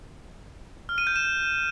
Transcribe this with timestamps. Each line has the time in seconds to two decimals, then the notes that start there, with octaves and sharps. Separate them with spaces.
0.89 F6
0.98 D#7
1.07 G6
1.16 E7